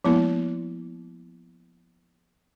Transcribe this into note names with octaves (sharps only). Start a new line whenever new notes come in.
F3 G#3 A#3 B3 E4